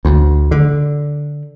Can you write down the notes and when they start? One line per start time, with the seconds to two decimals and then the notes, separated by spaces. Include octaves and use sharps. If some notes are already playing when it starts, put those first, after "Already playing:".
0.05 D2
0.51 D3